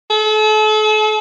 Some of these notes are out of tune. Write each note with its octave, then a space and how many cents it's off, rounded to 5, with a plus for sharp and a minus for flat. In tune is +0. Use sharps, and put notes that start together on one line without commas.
A4 -40